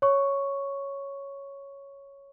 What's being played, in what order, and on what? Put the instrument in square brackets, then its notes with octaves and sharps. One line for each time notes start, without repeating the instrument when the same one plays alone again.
[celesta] C#5 C#6